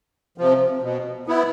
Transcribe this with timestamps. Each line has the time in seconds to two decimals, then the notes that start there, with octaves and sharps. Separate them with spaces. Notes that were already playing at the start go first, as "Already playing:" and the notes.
0.38 C3 F3
0.82 B2
1.27 B3 E4